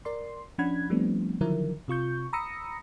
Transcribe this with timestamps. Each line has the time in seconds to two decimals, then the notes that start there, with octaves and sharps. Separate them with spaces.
0.05 A#4 D5 C6
0.58 F3 C#4 D4 F#5 B5 G#6
0.90 F3 G3 A3 B3 C4 D4
1.41 D3 D#3 F3 F#3 E4 A#4
1.88 C3 F4 C#6 G6
2.33 A#5 B5 D#6 E6 A#6 C#7